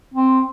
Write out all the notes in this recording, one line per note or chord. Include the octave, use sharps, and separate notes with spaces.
C4